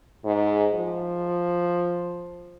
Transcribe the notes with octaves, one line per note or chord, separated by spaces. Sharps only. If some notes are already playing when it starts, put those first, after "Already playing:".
G#2
F3